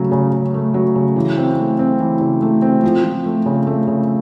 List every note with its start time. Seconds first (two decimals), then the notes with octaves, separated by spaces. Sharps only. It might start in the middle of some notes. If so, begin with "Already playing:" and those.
Already playing: C#3 F#3 A3
0.11 C#3
0.33 C#3
0.54 A3
0.74 F#3
0.95 C#3
1.16 E3
1.37 C4
1.59 A3
1.79 C4
2.00 E3
2.20 C#3
2.42 A3
2.62 C4
2.83 F3
3.04 F3
3.25 A3
3.46 C#3
3.67 A3
3.87 C#3